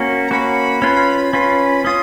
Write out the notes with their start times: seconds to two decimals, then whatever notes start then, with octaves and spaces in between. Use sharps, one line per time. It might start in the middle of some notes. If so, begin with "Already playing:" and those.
Already playing: A#3 C#4 F#4
0.27 A#5
0.31 A#3 C#4 F#4 B5
0.82 C#4 F4 B4
1.33 C#4 F4 B4
1.84 C#4 F4 D#6